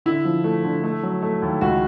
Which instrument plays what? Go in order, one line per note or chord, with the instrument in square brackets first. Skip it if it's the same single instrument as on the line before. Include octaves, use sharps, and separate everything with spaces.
[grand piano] D3 E4
F3
A3
D3
A3
F#3
A3
D#2
C#2 F#4